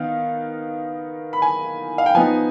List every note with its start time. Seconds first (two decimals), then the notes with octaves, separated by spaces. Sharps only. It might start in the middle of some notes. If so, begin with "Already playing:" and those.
Already playing: D#3 B3 D#4 F5
1.33 B5
1.42 G#5
1.98 F5
2.06 G5
2.14 F3 B3 D#4 G#5